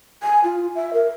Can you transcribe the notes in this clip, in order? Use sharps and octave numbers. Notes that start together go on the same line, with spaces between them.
G#5
F4
E5
A#4